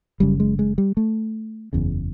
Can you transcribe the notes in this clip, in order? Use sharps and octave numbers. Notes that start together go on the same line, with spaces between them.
F#1 F#2 C#3 G3
G#3
G#3
G3
A3
F#1 E2 C#3